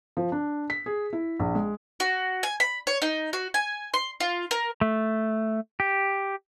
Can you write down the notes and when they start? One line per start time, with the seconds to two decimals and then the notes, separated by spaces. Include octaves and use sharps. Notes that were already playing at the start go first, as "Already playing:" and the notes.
0.17 F3
0.32 D4
0.70 B6
0.86 G#4
1.13 E4
1.40 A#1
1.55 G#3
2.00 F#4
2.43 G#5
2.60 B5
2.87 C#5
3.02 D#4
3.33 F#4
3.54 G#5
3.94 C6
4.20 F4
4.51 A#4
4.81 A3
5.80 G4